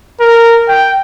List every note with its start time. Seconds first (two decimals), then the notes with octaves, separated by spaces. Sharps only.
0.20 A#4
0.68 G5